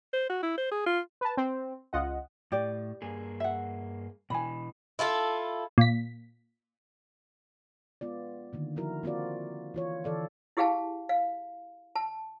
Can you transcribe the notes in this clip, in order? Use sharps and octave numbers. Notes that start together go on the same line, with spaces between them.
C5
F#4
E4
C5
G#4
F4
B4 A5
C4
C#2 F4 D#5 F#5
A2 G4 D5
G2 A#3 G#4
E5 F#5
B2 E3 G#5 B5
E4 F4 G#4 A4
A#2 B6
G#3 B3 F4 D5
D3 D#3 A#3
F3 E4 F#4 A#4
A#3 C4 F4 F#4 A#4 D5
E3 F4 C#5
D3 E3 A4 D5 F5
E4 G4 G#4 F5 G5 A5
F5
A5